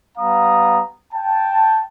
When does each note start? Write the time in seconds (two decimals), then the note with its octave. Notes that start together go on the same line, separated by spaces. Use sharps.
0.18 G3 B3 F5 A#5 D#6
1.13 G5 A5